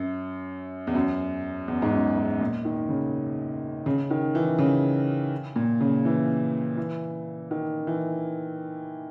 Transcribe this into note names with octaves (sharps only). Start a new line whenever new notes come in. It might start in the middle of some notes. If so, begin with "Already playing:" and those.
Already playing: F#2
E2
F#2
E2
G#2
F#2
G#2
A#2
D#3
C#3
C#3
D#3
E3
C#3
A#2
C#3
E3
E3
D#3
E3